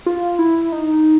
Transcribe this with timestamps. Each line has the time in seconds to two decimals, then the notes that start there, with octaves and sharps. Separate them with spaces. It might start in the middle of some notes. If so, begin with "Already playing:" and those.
0.06 F4
0.39 E4
0.72 D#4